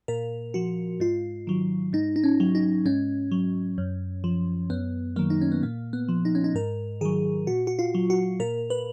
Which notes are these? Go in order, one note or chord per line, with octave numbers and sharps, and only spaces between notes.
A#2 A#4
F3 F#4
G#2 F4
D#3 F#3
G#2 D#4
D#4
C#4
F#3
D#4
G#2 C#4
F#3
F#2
F3
F#2 B3
D#3 F#3 A#3
D#4
C#4
B3
A#2 A#3
B3
F3
D#4
C#4
D#4
G#2 A#4
D#3 F#3 G#4
A#2 F#4
F#4
F4
F#3
F#4
A#2 A#4
B4